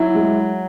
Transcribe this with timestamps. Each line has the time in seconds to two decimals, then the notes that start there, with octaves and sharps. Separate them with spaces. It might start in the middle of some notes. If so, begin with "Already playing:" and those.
Already playing: F#3 E4
0.15 G#3